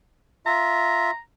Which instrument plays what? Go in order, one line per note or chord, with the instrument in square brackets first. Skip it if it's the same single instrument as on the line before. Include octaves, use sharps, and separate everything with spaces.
[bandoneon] F4 E5 [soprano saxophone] A#5